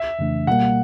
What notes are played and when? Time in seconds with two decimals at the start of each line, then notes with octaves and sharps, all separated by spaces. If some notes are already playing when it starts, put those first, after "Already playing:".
Already playing: E5
0.19 F2 C#3 E3 A3 D4
0.47 B2 G3 A#3 F#5